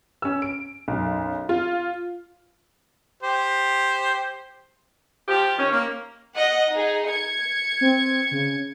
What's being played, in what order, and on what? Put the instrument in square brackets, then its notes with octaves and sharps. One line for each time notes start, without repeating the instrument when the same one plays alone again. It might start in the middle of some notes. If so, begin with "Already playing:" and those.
[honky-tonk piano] C#4 E6
D7
B1 F#2
F4
[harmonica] G4 C5
[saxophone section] F3 G4
D#3 C#4
A#3
[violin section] D#5 F#5
D#4 G#4
G#6 C#7
[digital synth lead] C4
C#3